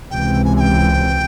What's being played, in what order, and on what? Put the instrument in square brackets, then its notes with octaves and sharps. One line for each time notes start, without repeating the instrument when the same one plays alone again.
[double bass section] C#2 C3 E3 [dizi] G5
[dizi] G#5
G#5
G5